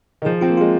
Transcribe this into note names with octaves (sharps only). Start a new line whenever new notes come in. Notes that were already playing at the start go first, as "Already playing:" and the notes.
D#3
F3 G#4
C4 F4
A#3
G#3 F4